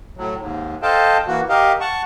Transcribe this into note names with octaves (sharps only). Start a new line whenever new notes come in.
A2 F#3
D#2 G#2
A4 C5 D#5 F5 G5 A5
E3 A#3 F#4
G4 A#4 D#5 F5
F#5 A5 C#6